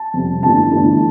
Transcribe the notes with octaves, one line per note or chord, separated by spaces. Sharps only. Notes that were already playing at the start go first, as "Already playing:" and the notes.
Already playing: A5
F2 C3 G3
G1 G2 E3 A3 A5
G1 G2 E3 A3